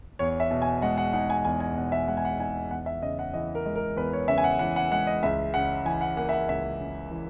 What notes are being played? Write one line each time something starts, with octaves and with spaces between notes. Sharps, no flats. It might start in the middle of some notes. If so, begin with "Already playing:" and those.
E2 C#5
E5
B2
G#5
G#3 F#5
F#5
D#4 F#5
G#5
E2 G#5
G#5
B2 F#5
E5
G#3 F#5
G#5
F#5
D#4 G#5
E2 F#5
E5
C#3 D#5
F#5
E3 D#5
A#4
G#3
A#4
E2 B4
C#5
C#3 E5
G#5
F#5
E3 F#5
F#5
G#3 F#5
D#5
C#2 E5
C#3 F#5
E3 G#5
F#5
A#3 F#5
E5
F#5
C#2 E5
C#3
E3